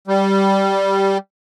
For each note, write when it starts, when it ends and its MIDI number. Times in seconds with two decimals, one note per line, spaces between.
0.08 1.18 55